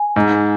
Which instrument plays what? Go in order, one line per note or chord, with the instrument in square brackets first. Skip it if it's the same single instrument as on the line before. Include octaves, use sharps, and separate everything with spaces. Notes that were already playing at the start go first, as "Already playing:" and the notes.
Already playing: [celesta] G#5
[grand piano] G#2